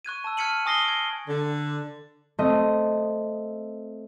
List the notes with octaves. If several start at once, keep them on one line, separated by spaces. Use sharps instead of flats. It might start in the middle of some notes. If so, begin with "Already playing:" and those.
C#6 F#6 G#6 D#7
A5 E6
F6 G#6 B6 C#7 D#7 F#7
G#5 C#6 D#6 A#6 C7 G7
G#6 D7
D3
A3 C4 D#5